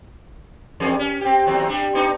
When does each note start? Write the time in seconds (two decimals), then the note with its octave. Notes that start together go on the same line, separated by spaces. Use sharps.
0.80 E2 G2 G#4
0.99 C#4
1.21 C4 G4
1.47 D#2 F#3 C4
1.69 G3 D4
1.95 B3 D4 D#4